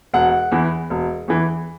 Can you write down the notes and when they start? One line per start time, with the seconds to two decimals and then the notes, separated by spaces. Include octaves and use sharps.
0.14 E1 F#5
0.52 E2 E3
0.90 E1
1.28 E2 E3